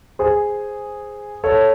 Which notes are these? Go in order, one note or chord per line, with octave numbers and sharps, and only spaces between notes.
G#4 C5
A4 C#5